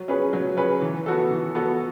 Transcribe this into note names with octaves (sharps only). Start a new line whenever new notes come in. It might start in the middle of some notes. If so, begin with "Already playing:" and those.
Already playing: F#3
C#4 G#4 B4
F#3
C#4 G#4 B4
E3
B3 F#4 A4
E3
B3 F#4 A4